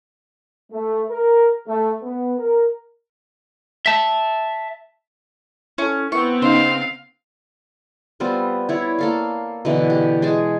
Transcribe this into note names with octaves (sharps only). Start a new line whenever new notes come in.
A3
A#4
A3
B3
A#4
E5 A5
C#4 E4 A4
B3 C4 E4 C#6
C#3 D#4 C5 F5
G3 B3 C4 F4
E4 C#5 D5
A#3 A4 F5
B2 D3 E3
G4
G#3 G#4 G#5 A5